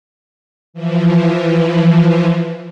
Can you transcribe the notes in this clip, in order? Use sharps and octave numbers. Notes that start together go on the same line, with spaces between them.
E3 F3